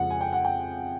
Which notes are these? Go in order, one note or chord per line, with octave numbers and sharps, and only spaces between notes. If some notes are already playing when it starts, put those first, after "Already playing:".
Already playing: F2 C#3 F3 G#3 F#5
G#5
G5
F#5
G5